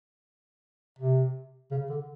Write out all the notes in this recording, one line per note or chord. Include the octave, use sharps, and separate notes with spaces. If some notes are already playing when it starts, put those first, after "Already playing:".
C3
C#3
D3